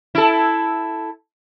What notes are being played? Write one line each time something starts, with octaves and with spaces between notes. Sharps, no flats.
E4 A4